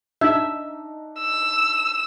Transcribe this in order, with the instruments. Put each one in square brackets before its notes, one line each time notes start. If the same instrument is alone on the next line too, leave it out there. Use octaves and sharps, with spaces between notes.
[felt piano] D4 D#4 [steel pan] E5
[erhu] E6